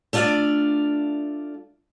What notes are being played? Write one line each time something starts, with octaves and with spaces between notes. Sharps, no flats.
A3 D4 F4 F#4 D5 F5